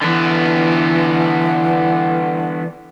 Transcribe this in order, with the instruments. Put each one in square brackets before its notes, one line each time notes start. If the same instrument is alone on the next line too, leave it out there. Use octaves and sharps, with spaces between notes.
[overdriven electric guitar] D3 B3 [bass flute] E3